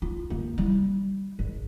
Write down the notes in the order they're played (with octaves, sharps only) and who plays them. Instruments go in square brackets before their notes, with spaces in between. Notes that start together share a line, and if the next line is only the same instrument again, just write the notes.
[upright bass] F4
D3 A#3
G3 E4
G#1